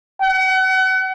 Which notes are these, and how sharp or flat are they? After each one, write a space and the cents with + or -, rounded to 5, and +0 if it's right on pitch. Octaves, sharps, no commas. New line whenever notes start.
F#5 +35